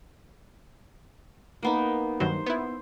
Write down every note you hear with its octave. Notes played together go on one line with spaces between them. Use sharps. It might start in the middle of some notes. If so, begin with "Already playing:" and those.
A#3 B3 D#4
G2 D#3 F#3 C5
B3 E4